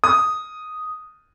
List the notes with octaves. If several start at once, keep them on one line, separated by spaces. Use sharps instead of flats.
D#6